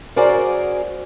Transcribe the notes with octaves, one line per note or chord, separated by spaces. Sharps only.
C#4 F#4 G#4 A#4 C5 D5